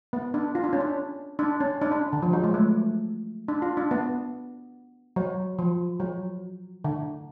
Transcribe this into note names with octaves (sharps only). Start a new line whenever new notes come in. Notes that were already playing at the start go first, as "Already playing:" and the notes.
B3
D4
F4
D4
C#4
D4
D4
C#4
D4
D4
C#4
D3
F3
F#3
G#3
A3
D4
F4
D4
B3
F#3
F3
F#3
D3